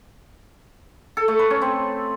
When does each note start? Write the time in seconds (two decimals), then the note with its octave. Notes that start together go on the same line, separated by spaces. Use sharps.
1.17 A4
1.28 A3
1.39 B4
1.50 C#4
1.62 C4